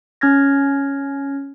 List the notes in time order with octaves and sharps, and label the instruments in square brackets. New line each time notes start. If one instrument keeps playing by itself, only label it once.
[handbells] C#4 F6 G#6 A#6